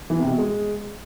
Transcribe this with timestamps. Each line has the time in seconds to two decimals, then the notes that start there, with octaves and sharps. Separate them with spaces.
0.10 E3
0.19 C3
0.28 B2
0.38 G#3